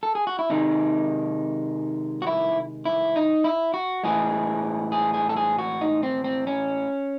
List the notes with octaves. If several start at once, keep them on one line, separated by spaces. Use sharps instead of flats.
A4
G#4
F#4
E4
C3 D#3 G#3 D#4
F#4
E4
E4
D#4
E4
F#4
A2 E3 G#3 G#4
G#4
G#4
A4
G#4
F#4
D#4
C4
C4
C#4